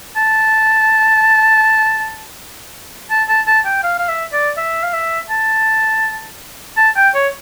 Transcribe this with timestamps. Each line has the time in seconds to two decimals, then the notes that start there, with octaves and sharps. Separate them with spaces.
0.16 A5
3.10 A5
3.28 A5
3.47 A5
3.66 G5
3.83 F5
3.99 F5
4.08 E5
4.33 D5
4.57 E5
4.83 F5
4.94 E5
5.30 A5
6.77 A5
6.96 G5
7.15 C#5